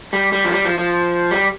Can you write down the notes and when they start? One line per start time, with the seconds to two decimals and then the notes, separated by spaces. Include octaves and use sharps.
0.13 G3
0.32 G3
0.44 F3
0.52 G3
0.65 F3
0.78 F3
1.31 G3